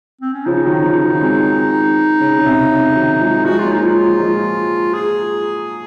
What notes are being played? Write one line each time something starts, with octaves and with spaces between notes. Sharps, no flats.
C4
C#4
C#3 F3 D#4
D#3 F#3
C#3 F3
D#3 F#3
G#3 C4
C#3
C#3
C3
C#3
D#3 F#3
F3 G#3
F3 G#3 F#4
F#3 A#3 F4
D#4
F3 G#3 F4
F3 G#3
G#4